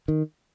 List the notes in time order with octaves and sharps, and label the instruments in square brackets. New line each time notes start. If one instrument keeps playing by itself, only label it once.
[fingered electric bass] D#3